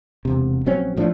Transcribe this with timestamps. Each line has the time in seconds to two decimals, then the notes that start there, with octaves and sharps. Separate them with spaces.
0.25 E1 C3
0.66 A#1 F#3 C4 C#4
0.96 A#1 A2 F3 D4